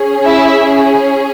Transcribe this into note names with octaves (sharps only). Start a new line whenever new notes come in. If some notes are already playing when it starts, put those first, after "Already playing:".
Already playing: C#4 G#4
E4 E5